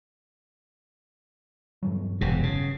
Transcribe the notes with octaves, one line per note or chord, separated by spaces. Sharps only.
G2 E3 F#3
E1 C3
C#3